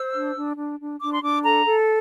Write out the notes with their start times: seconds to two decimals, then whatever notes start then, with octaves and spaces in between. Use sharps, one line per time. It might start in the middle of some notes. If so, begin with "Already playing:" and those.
Already playing: C5 E6
0.13 D4
0.35 D4
0.56 D4
0.79 D4
1.00 D4 D6
1.12 C6
1.22 D4 D6
1.43 A4 A#5
1.65 A4